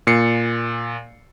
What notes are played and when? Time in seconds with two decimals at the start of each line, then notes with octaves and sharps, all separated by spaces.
0.07 A#2 C7 C#7